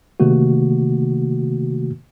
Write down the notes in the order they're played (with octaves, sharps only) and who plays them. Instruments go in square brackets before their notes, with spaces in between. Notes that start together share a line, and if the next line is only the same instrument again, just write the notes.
[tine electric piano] C3 D#3 A3 A#3 F#4